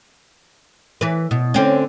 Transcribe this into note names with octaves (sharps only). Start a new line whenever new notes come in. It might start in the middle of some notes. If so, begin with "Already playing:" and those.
E3 B4
B2
D3 C4 C#4